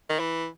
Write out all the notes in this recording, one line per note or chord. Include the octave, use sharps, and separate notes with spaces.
D#3
E3